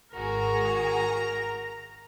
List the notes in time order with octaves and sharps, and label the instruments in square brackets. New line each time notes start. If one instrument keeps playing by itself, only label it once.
[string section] G#1 F#4 G#4 [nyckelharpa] A#4 [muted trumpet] A#5